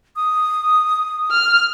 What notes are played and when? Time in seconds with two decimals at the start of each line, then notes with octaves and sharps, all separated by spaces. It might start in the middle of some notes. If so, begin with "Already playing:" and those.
0.16 D#6
1.31 F6